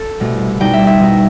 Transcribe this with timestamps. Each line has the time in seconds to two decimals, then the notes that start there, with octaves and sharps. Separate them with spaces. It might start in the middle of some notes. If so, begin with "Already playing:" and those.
Already playing: A4
0.20 C2 B2 A3
0.60 B2 G3 D#4 G5
0.74 E5
0.87 E5
1.00 B2 G3 D#4